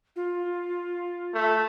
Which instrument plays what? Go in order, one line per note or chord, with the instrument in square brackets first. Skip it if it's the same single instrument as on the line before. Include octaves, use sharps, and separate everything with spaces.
[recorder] F4
[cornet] A3